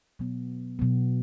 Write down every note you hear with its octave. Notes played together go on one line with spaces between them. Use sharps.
B2 F#3 B3
B2 F#3 B3